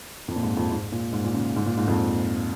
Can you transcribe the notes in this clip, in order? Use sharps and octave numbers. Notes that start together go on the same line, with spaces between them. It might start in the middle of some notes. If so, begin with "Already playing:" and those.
F2
A#2
G#2
F2
G#2
A#2
G#2
A#2
C#3
G#2
A#2
G#2
F2